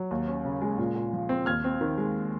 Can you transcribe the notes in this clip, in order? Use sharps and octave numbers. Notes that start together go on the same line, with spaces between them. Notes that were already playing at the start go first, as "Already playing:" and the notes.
Already playing: F#3
D#2
C#4
C#3
G#3
A#2
A#2
F3
C4
D#2 F6 G#6
C4
D#3
G#3